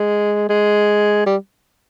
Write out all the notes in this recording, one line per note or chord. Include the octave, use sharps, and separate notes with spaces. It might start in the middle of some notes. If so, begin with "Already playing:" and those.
Already playing: G#3
G#3
G3